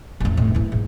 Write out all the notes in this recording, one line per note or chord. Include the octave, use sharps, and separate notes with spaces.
A1 F2
A2
E3 E4
G#2